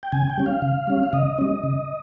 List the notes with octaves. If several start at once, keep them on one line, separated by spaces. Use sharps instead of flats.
G5
C#3 G#5
G5
G3 C#4
F5
C#3
G3 C#4
F5
C#3 D#5
G3 C#4
C#3